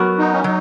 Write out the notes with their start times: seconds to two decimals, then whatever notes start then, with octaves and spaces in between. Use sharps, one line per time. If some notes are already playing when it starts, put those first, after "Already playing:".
Already playing: F#3 B3 F#4 A#4
0.18 D#4
0.33 C#4
0.44 F#3 D#4